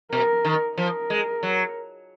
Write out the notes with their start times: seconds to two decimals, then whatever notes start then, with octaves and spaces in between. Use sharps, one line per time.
0.12 B2 A#4
0.45 D#3
0.78 F3 A#4
1.10 G#3
1.43 F#3